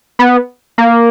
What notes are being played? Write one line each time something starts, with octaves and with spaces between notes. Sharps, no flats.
B3
A#3